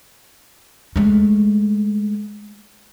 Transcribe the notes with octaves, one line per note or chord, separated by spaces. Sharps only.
G#3 A3